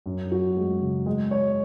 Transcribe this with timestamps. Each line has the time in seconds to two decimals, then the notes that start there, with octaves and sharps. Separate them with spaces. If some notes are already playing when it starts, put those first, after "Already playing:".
0.06 F#2
0.31 F#4
0.57 G#3
0.81 C#3
1.06 G#3
1.31 C#5